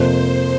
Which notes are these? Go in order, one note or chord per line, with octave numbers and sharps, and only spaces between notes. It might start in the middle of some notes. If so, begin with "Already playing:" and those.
Already playing: F2 C3 F3 A#3 C5